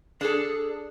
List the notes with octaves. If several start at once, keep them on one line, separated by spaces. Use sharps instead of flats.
D4 G#4 A4